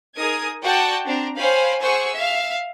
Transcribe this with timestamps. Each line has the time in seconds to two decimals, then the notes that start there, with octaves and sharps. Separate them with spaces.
0.17 D#4 G#4 A#4 D#6 G#6
0.62 F#4 D5 F#5 G5 A5 C#6
1.05 C4 D4 A#5
1.37 C5 C#5 F5 G5 G#5 B5
1.81 G#4 C5 F#5 G#5 C#6 E6
2.14 E5 F5